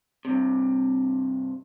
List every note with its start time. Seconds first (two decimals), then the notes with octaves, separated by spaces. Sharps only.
0.25 G2 C3